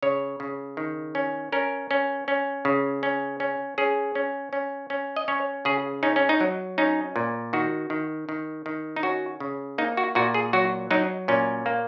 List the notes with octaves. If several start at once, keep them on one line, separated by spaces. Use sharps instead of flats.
C#3 C#5
C#3
D#3
C#4
C#4 A#4
C#4
C#4
C#3
C#4
C#4
C#4 G#4
C#4
C#4
C#4
D#5
C#4 C#5
C#3 G#4
C#4 D#4
C#4
D#4
F#3
C#4 D#4
A#2
D#3 F#4
D#3
D#3
D#3
D#4
C#4 F#4
C#3
A#3 D#4
F#4
A#2 F#4
G#4
F#3 F#4
F#3 D#4
A#2 C#4
A#3